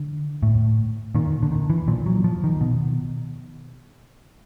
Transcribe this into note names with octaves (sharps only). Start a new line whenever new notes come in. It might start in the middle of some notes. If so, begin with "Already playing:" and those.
Already playing: D3
A2
A#2 D#3
D3
D#3
E3
A#2 F3
F#3
F3
D#3
B2